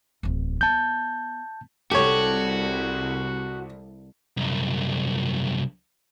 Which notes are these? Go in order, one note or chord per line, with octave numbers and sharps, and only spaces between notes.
D1 E2
B3 A5 G6
C2 F#4 G4 A4 C#5
C2 F#2